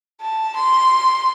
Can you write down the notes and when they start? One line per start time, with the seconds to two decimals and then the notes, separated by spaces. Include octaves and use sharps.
0.21 A5
0.56 C6